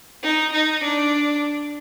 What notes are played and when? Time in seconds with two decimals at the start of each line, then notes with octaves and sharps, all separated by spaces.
0.23 D#4
0.53 D#4
0.84 D4